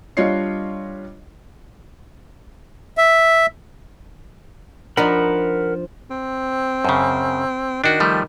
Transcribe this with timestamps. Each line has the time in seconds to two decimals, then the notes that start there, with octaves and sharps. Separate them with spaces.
0.17 G3 D4 F4 C#5 D#5 C7
2.98 E5
4.97 F3 D4 D#4 A#4 F#5 B5
6.10 C4
6.85 F#2 C#3
7.84 D#3 D4 F#4
8.00 F3 G3 A3